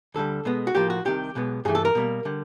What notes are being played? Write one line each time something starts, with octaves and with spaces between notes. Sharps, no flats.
D2 D3 G3 A4
B2 G#3 B3
F#4
A2 F3 A#3 G4
F#4
C2 C3 D#3 G4
B1 B2 G#3 B3
G2 E3 A3 G#4
A4
A#4
B2 G3 A#3
D3 G3